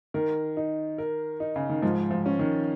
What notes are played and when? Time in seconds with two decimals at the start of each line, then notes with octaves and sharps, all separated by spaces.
0.14 D#3 A#4
0.57 D#4
0.98 A#4
1.40 D#4
1.56 C#3
1.70 D#3
1.82 G#2 F3
2.11 F3
2.26 C#4
2.39 D#3